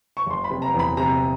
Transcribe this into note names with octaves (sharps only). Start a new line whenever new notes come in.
C#6
F#1 C6
B5
C3
A#5
E2
B5
C3 A#5